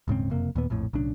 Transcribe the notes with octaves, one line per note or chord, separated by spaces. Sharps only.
D#1 G#2 C#3 C4
F#1 F2 C3 A#3
D#2 A#2 B3
A#1 F2 A2
B1 A2 C#3 D4